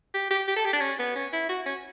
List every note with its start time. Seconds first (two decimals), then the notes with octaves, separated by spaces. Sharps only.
0.14 G4
0.31 G4
0.48 G4
0.56 A4
0.65 G4
0.73 D4
0.81 C#4
0.99 B3
1.15 C#4
1.33 E4
1.49 F#4
1.66 C#4